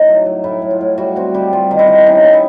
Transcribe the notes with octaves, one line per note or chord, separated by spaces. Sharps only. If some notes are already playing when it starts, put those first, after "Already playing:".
Already playing: A2 D#4 C#5
F#3
F#3
A2 E4
A2
F4
A2
G3 F#4
C4 F#4
G3 G4
G3 F4
D#3
E4
D#3
C#4 D#4
C#4
E4